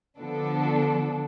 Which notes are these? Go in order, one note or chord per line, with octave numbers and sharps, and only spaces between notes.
D3 F3 B3 D4 A4